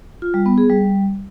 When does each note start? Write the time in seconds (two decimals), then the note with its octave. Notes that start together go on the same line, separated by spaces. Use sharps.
0.22 F4
0.34 G3
0.46 B3
0.58 G#4
0.70 G3